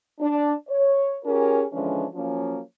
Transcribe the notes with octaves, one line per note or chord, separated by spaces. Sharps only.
D4
C#5
C#4 F4 G4 G#4 A#4
D3 E3 F3 G#3 C#4 D4
F3 F#3 A#3 C#4